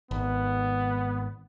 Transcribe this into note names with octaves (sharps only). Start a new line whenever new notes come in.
G#1 B3